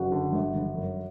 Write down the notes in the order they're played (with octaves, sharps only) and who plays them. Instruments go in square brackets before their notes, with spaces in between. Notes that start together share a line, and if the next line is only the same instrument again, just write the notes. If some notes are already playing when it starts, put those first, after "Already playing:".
Already playing: [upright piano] F#1 [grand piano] F#4
[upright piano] D3
G1
G1
F#2